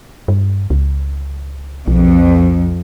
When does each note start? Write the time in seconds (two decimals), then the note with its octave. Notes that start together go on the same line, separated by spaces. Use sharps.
0.28 G2
0.70 C#2
1.88 B1 F2